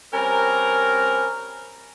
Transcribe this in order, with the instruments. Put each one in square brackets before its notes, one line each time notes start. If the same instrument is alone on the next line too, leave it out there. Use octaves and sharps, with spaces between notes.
[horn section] G3 C4 C#4 A#4